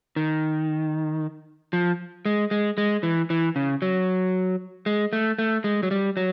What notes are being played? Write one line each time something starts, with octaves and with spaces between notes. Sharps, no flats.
D#3
F3
G#3
G#3
G#3
E3
E3
C#3
F#3
G#3
A3
A3
G#3
F#3
G3
F#3